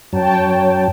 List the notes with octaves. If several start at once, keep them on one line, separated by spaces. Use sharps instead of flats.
F#2 F#3 C#5 G5 A5